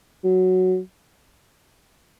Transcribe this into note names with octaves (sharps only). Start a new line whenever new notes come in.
F#3